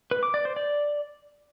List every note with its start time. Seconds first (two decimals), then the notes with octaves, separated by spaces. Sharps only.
0.11 B4
0.23 D6
0.34 D5
0.45 C5
0.56 D5